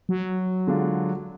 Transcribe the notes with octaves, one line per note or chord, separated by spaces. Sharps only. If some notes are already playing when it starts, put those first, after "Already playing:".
F#3
D3 G#3 D4 F4